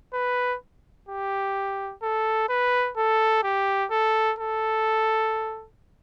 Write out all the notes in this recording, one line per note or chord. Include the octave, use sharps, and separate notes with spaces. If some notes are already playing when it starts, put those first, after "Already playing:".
B4
G4
A4
B4
A4
G4
A4
A4